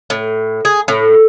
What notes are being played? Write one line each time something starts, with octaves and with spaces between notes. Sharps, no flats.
A2
G#4
A2